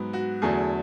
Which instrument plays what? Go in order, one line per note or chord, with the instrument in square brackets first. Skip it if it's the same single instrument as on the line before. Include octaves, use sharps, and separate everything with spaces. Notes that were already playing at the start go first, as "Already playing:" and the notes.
Already playing: [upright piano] G#2 F#3 B3
F#4
E2 D3 F#3 A3 G#4